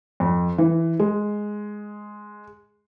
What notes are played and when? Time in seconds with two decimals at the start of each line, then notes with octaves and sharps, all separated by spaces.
0.20 F2
0.58 E3
1.00 G#3